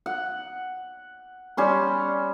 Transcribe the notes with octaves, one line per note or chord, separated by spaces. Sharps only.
F#5
G3 C#4 C6